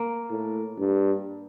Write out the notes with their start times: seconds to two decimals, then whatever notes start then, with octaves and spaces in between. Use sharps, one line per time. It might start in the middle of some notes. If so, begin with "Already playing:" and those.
Already playing: A#3
0.30 A2
0.78 G2